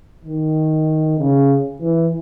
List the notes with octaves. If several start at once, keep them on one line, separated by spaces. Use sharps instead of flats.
D#3
C#3
E3